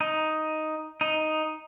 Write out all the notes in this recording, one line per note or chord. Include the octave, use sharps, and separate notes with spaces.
D#4
D#4